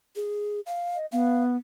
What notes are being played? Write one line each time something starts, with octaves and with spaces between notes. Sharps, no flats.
G#4
F5
D#5
B3 F5